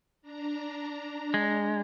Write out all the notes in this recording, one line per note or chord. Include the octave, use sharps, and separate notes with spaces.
D4 A#5
G#3